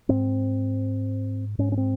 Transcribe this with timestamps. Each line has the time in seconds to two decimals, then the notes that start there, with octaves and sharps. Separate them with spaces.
0.09 G#2 C4
1.59 G#2 C#4
1.72 C#4
1.77 C4